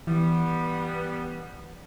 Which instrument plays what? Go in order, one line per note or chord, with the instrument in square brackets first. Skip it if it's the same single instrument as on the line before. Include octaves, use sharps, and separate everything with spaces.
[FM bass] E3 [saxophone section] G3 B3